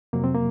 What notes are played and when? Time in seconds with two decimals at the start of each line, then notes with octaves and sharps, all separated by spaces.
0.13 F2 C3 F#3 A#3
0.24 C4
0.34 A#3